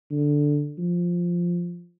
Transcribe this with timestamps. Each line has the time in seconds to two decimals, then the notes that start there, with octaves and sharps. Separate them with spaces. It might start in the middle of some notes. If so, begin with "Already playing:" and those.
0.11 D3
0.78 F3